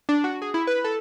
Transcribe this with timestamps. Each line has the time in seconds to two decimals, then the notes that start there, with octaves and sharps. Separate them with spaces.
0.09 D4
0.24 F#4
0.42 G#4
0.54 E4
0.67 B4
0.85 A4